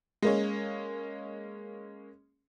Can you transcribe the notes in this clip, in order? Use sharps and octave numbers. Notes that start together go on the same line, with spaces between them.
G#3 A#3 C#4